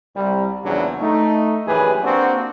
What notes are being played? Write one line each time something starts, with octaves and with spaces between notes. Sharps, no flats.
C2 G3
A#1 E2 C#3 F#3 D4
A3 D#4
A#1 F#2 E3 G4 G#4 B4
A#3 C4 D4 F#4